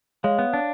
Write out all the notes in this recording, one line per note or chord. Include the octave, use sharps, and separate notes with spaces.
G#3 C#5 F5
B3
D4